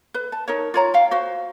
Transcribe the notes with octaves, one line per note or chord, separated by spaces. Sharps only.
B4
A5
D#4 A#4 C#5
F4 C#5 A#5
F5 G5
F#4 C5